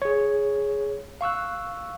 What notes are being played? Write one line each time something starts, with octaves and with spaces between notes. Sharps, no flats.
G#4 C#5
F5 C#6 E6 F#6